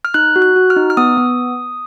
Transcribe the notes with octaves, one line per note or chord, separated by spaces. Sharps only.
F6
D#4 F#6
F#4
F#6
F#4
F6
D#4
F6
B3 D#6
B3